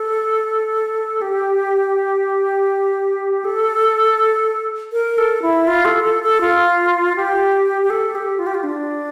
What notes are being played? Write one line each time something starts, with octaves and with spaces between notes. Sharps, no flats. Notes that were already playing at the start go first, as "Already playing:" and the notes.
Already playing: A4
G4
A4
A#4
A4
E4
F4
A4
A4
A4
F4
G4
G4
A4
G4
F4
G4
F4
D4